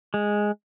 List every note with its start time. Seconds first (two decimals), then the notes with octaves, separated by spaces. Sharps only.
0.14 G#3